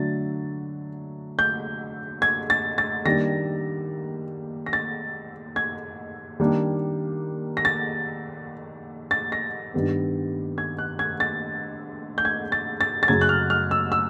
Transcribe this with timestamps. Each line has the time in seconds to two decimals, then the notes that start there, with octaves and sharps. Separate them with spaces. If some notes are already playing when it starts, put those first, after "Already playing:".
Already playing: D3 F#3 A3 D4 A6
1.39 G6
2.22 G#6
2.50 A6
2.78 A6
3.05 D#3 G3 A#3 D4 A#6
4.66 A#6
4.73 A6
5.56 G#6
6.40 D#3 G3 A#3 D4
7.57 A#6
7.65 A6
9.11 A6
9.32 A#6
9.74 G2 D#3 G3 B3
10.58 G#6
10.79 F#6
10.99 G#6
11.20 A6
12.18 G6
12.25 G#6
12.52 A6
12.81 A6
13.03 A6
13.08 F#2 C#3 F#3 G#6
13.21 F#6
13.29 F6
13.50 F6
13.71 E6
13.92 E6